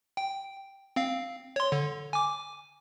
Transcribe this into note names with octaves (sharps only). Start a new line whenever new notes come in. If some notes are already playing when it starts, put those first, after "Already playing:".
G5
C4 F5
C#5 C6
D3
G#5 D6